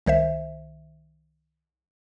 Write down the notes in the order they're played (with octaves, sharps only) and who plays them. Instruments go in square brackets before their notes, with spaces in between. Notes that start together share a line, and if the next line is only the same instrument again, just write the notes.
[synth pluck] C2 D#3 C5 E5